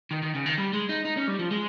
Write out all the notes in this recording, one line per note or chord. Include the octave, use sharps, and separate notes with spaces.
D#3
D#3
C#3
D#3
G3
G#3
D#4
D#4
C#4
G3
F3
G#3